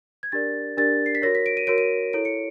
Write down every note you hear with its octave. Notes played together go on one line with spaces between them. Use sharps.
G#6
D4 G4 A#4 D5 A6
D4 G4 A#4 D5 A6
C7
B6
F#4 A#4 C#5 A#6
B6
D7
D#7
F#4 A#4 C#5 D7
D#7
E4 A4 C#5 D7
C#7